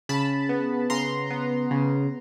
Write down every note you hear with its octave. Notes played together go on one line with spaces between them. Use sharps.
C#3 A5 B5
B3
C#3 A#5 C6
B3
C#3